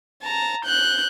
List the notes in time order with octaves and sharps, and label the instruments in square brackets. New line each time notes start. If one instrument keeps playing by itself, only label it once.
[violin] A5 A#5
F#6 G6